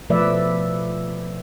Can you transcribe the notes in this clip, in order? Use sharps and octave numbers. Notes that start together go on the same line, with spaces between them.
B2 F3 A3 B4 D5 E5